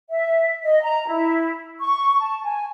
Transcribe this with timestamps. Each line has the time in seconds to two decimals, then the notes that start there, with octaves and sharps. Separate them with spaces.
0.08 E5
0.64 D#5
0.83 A#5
1.07 E4
1.80 C#6
2.20 A5
2.43 G#5